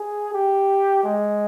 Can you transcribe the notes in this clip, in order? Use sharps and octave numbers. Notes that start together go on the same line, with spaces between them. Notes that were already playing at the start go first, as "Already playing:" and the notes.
Already playing: G#4
G4
G#3